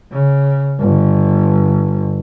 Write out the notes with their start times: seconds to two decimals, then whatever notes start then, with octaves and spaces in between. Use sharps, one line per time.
0.13 C#3
0.80 G1